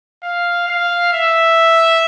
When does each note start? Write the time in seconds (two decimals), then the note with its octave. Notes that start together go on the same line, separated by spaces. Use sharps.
0.23 F5
0.68 F5
1.13 E5